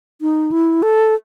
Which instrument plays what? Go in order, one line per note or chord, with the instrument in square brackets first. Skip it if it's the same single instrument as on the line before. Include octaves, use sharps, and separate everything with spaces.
[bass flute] D#4
E4
A4